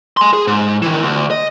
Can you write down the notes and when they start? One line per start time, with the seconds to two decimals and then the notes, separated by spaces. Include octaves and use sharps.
0.17 G#5 C6
0.33 G#4
0.47 G#2
0.82 D#3 E3
1.02 D2
1.31 D#5